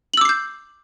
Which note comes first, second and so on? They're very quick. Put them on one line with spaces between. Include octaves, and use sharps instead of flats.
F#7 E6 D6 C7 G6